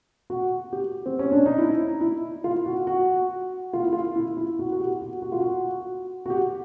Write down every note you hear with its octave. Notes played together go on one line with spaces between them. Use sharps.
F#4
G4
C4
C#4
D4
D#4
E4
E4
F4
F#4
F#4
F4
E4
F4
E4
E4
F#4
F#4
G4
F#4
F#4
F4
F#4
F#4
G4